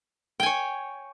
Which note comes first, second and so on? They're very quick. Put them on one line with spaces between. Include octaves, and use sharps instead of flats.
G5 G#5 C#5